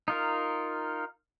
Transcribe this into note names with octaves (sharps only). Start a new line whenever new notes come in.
D#4 F4 A#4